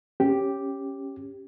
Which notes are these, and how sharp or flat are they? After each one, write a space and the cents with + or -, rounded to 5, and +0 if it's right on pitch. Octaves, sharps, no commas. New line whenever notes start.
C#4 -10 G4 +0